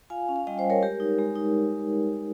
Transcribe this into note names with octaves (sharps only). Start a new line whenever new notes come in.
F4 F5 G#5
C#4
F5
G3 D#5 G5
C5 D#5
G3
A#4 C#5
G#3 G4 A#4
D#4
G#3
D#4